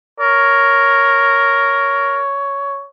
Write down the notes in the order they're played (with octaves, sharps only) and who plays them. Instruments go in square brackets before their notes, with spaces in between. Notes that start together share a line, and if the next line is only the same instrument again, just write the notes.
[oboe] A#4 [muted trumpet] C#5